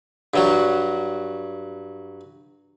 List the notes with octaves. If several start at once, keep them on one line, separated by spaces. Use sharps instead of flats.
G2 F#3 F#4